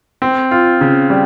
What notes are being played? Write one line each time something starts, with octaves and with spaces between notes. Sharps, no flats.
C4
F4
C#3
G3